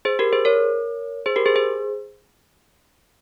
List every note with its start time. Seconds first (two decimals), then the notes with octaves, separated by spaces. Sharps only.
0.05 G#4 C5
0.19 G4 A#4
0.33 G#4 C5
0.45 A#4 C#5
1.26 G#4 C5
1.36 G4 A#4
1.46 G#4 C5
1.56 G#4 C5